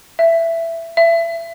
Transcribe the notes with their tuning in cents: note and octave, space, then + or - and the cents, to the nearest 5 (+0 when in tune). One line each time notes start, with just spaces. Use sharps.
E5 +10
E5 +25